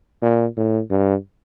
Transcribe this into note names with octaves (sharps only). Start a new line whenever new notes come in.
A#2
A2
G2